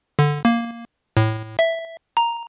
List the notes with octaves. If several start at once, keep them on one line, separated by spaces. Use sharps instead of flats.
D3
A#3
A2
E5
A#5